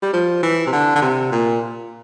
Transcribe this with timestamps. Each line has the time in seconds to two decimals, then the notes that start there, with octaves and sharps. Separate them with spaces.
0.02 G3
0.13 F3
0.43 E3
0.67 C3
0.73 D3
0.96 D3
1.02 C3
1.32 A#2